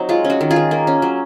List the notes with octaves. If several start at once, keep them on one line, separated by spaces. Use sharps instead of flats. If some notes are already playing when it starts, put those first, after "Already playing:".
Already playing: F#3 C4 D#4
G#3 F4
C#4
F#4
D#3
F4 G#4
D#3
A#3
C#4
F#3